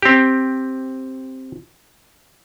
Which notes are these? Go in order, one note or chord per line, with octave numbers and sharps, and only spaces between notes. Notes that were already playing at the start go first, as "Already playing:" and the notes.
C4 G4